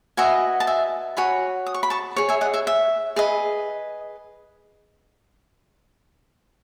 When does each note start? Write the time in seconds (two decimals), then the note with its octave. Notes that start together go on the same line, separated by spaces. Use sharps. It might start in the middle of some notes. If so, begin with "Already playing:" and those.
0.17 F#4 B4 D#5 E5 G#5
0.60 A5
0.67 E5 G#5
1.17 F#4 C#5 G#5 B5
1.66 D#6
1.74 C#6
1.83 B5
1.90 A5 C#6
2.16 G#4 C#5
2.29 E5 G#5
2.41 D#5 F#5
2.54 E5 G#5
2.67 E5
3.16 G#4 B4 D#5